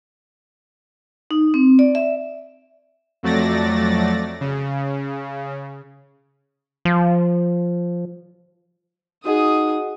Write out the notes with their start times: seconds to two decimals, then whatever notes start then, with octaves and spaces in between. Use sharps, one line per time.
1.31 D#4
1.54 C4
1.79 D5
1.95 E5
3.23 F2 F#3 A3 D5 A6 A#6
4.41 C#3
6.85 F3
9.25 D#4 F#4 G#4 D#5 F#5 D#6